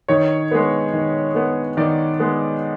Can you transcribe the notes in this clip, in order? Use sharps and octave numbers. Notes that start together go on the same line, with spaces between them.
D#3 C#5
G#3 B3
D#3
G#3 B3
D#3 D5
G#3 B3